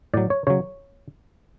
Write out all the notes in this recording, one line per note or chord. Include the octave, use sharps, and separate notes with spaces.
A2 F#3 D5
C#5
C#3 F#3 C#5